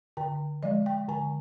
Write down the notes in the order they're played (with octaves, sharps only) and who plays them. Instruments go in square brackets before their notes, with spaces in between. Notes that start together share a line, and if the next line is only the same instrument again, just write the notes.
[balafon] D3 G5
F3 G#3 D#5
G5
D3 G#5